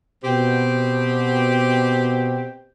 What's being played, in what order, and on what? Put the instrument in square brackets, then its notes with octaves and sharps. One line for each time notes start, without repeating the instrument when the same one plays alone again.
[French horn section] B2 [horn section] C4 G4 G5